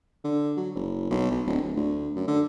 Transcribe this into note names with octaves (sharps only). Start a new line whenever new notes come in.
D3
F#3
F#1
B1
B1
D1
D1
D2
F#2
D3